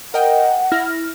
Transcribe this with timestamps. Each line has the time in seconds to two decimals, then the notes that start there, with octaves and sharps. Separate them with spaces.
0.14 A#4 D#5 F#5 G5
0.72 E4 F6 A#6